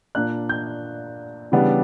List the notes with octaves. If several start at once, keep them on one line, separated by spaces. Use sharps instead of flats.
A#2 A#3 D4 F#6
G6
C#3 E3 G3 B3 D4